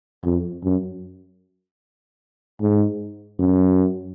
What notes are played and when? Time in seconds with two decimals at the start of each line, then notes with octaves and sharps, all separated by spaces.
0.25 F2
0.64 F#2
2.61 G#2
3.39 F#2